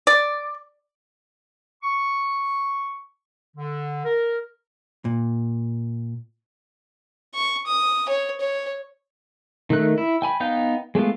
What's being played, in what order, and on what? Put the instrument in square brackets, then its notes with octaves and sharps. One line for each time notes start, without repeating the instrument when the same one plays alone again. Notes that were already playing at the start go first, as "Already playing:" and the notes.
[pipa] D5
[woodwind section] C#6
D3
A#4
[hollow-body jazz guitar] A#2
[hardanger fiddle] C#6
D#6
C#5
C#5
[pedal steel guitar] D#3 A3 F#6
E4
G5 G#5 B5
B3 D#4 F5 G5 G6
G#3 A3 B3 F4